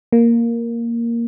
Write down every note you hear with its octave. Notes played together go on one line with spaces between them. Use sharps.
A#3